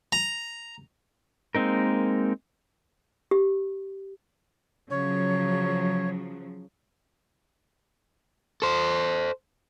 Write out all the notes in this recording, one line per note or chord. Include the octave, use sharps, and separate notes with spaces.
A#5
G#3 A#3 C4 D#4 A#4
G4
C#3 F3 F#3 C#5
A4 C5